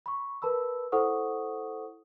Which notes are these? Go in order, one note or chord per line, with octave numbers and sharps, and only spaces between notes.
B5 C#6
A#4 B4 A5 B5 E6
E4 A4 C5 F#5 C#6 D#6